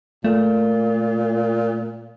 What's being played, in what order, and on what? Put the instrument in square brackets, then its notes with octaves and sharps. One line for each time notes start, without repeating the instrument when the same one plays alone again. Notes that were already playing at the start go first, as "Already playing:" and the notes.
[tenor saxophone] A#2 [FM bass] A3